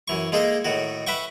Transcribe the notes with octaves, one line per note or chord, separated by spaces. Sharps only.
F#2 E3 C#6
G#3 A#3 D#4 G#4 A4
A2 D#3 F#4
B4 E5 F#5 G5 C#6